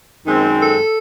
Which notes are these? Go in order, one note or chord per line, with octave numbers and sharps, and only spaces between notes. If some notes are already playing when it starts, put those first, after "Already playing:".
F#2 D#3 G#3 C4
A4